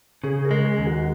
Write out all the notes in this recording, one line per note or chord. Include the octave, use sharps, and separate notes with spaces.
C#3 G#4
A#4
G#3
G#4
D#2
F#4